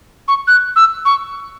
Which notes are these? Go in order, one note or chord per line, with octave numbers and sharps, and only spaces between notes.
C#6
F#6
E6
C#6